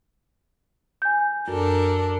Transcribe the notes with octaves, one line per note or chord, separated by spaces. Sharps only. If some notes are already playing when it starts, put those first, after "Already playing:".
G#5 G6
F#2 D4 A4 A#4